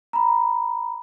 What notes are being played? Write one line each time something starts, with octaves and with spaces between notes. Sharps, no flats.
A#5 B5